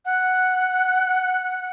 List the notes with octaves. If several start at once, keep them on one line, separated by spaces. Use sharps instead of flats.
F#5